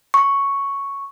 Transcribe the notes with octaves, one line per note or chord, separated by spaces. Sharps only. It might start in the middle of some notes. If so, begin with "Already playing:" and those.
C#6